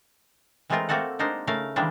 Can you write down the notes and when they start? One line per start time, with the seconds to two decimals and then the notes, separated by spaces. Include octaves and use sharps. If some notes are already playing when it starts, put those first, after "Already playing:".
0.70 E3 G#3 A3 C4 F4 A#4
0.89 A3 A#3 C4 F#4 A4 F#5
1.19 G#3 D4 D#4 A#4 C5
1.47 C#3 A3 A#4 F5
1.76 D#3 E3 G3 G#3 A#3 D4